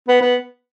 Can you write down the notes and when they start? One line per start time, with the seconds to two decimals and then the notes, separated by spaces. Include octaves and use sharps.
0.08 B3
0.21 B3